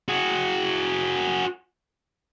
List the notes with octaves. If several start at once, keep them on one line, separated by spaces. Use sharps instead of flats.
F#4 G#4